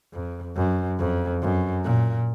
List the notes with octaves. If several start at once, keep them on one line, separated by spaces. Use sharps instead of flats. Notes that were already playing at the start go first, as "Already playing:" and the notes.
F2
F#2
F2
F#2
A#2